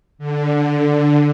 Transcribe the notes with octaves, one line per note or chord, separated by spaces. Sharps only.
D3